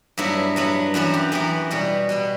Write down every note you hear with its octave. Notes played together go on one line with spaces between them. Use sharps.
G2 F#3 B3 E4
G2 F#3 B3
F#2 E3 B3 F#4
G4
F#2 E3 B3 F#4
B2 G3 B3 F#4
B2 G3 B3